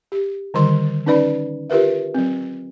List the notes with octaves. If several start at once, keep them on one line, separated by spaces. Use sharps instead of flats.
G4
D3 D#3 G3 C6
C#4 D#4 B4 D5 B5
F4 G4 A#4 B4 E5
F#3 C4